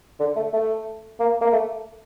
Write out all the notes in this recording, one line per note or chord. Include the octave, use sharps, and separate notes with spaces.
D3
A3
A3
A#3
A#3
A3